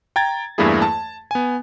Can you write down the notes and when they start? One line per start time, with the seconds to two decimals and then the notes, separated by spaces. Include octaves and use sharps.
0.16 G5 A#5 G#6 A6
0.58 E2 G2 A3 A#3 E4 G#4
0.82 A5
1.31 B3 G#5